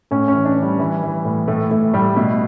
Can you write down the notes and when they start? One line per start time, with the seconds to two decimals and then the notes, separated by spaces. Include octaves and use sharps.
0.11 A2 C#4
0.28 C#4
0.33 E3
0.45 D4
0.56 E3
0.62 G3
0.79 E3
1.03 E3
1.25 A2
1.48 A2 A3
1.70 A2 A3
1.94 A2 G3
2.16 B2 A3